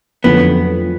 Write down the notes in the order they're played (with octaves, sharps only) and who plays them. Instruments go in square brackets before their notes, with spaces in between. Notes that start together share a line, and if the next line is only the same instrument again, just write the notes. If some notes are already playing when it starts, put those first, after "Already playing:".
[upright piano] F2 D3 F#3 A3 C#4 [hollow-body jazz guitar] B3